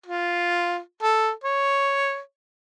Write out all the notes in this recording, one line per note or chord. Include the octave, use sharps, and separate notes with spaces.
F4
A4
C#5